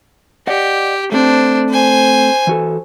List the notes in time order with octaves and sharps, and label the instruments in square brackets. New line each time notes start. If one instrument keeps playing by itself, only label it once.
[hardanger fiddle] G4 [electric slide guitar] D5 D#5 F#5
[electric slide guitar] A3 C4 [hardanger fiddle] D4 C5
[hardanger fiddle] C5 G#5
[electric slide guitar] E3 F#4 A4